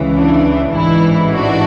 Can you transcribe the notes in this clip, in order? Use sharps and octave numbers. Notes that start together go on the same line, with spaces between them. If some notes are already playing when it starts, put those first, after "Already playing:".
Already playing: C#2 C#3 E3
D4
A1 G#2 E3 E4
D4 F#4